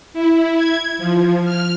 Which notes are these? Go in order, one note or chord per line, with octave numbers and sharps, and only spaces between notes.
E4
G#6
F3
F6